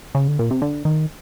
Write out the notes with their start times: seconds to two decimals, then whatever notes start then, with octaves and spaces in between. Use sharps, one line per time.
0.15 C#3
0.28 D3
0.39 A#2
0.51 C3
0.62 D3
0.85 D#3